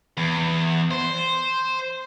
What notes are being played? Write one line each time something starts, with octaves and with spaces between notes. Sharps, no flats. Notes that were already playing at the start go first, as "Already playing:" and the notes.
E2
C5